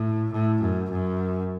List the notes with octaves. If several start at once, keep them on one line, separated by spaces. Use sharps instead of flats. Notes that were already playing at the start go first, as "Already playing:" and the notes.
Already playing: A2
A2
F#2
F#2